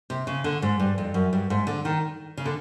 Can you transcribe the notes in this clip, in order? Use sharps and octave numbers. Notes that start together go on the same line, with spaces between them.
C3
C#3
D3
G#2
G2
F2
F#2
G2
G#2
D3
D#3
C#3
D3